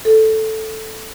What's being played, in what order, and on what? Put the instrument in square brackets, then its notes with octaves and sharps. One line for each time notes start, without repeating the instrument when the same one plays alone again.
[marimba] A4